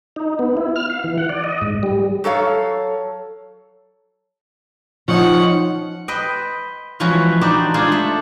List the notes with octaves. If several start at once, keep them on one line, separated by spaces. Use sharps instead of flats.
D#4
B3
E4
F6
F5
E3
F#5
D5
D#5
G#2
G3
F#3 A4 C#5 F5
F3 C#4 D#4 F#5
B4 C5 D#5 G5
E3 F3 G#3 C#4 F#4 B4
D4 D#4 F#4 C5 D5 G5
G#3 D4 F4 G#4 C5
A3